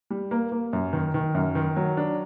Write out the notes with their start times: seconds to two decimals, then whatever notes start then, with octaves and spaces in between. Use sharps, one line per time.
0.10 G3
0.31 A#3
0.52 A#3
0.73 F#2
0.93 D#3
1.14 D#3
1.35 F#2
1.55 D#3
1.76 F#3
1.97 D4